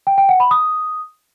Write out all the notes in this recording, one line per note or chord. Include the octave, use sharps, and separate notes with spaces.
G5
G5
F#5
B5
D#6